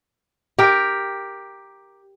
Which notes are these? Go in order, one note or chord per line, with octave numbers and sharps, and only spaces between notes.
G4 A#4